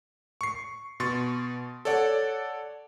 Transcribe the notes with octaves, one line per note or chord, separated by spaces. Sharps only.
C#6 C7
B2 C6 C#6 A6
A4 C#5 D5 F#5